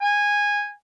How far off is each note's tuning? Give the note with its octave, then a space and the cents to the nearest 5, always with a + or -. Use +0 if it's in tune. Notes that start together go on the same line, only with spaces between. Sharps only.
G#5 -10